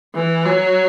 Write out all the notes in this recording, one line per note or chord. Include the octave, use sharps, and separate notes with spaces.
E3
F#3